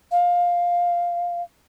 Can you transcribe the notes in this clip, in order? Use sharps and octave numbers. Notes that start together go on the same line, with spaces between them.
F5